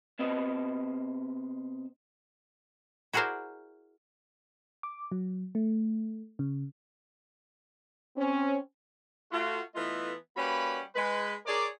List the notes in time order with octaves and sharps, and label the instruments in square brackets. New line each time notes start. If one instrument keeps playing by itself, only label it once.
[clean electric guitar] B2 C4 B4 D#5
[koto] E4 F#4 G#4 A#4 C5 D5
[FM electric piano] D6
F#3
A3
C#3
[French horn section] C4 C#4
[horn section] A3 F4 F#4
E3 A3 B3 F4 A4 D#5
G3 A#3 C#4 F#4 B4 B5
G#3 B4
G#4 A#4 C#5 D5